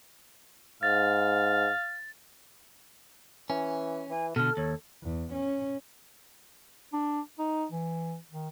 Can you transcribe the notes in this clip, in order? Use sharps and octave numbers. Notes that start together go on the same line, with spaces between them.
G#2 F5 A6
E3 C#4
E3 G#5
B2 D3 A4 F6
D#2 C#5
E2
C#4
D4
D#4
E3
D#3